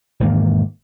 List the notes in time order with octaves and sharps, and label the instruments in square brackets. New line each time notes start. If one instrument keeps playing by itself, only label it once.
[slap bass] E1 G#2 D#3 A#3